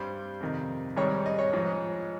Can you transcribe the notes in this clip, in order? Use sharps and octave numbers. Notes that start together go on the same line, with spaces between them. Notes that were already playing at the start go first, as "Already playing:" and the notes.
Already playing: G2 G3 C5
F2 C3 D#3
G#2 D#3 G3 C#5
D#5
C#5
G#2 F3 G#3